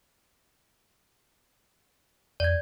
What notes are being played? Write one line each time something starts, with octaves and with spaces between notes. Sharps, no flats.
F2 D5 G#6